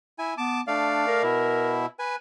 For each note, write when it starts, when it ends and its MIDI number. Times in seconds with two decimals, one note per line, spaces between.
0.19 0.34 64
0.19 0.34 80
0.38 0.61 59
0.38 0.61 81
0.38 0.61 86
0.67 1.23 57
0.67 1.05 62
0.67 1.23 74
0.67 1.23 77
1.08 1.80 70
1.23 1.86 47
1.23 1.86 64
1.99 2.16 71
1.99 2.16 80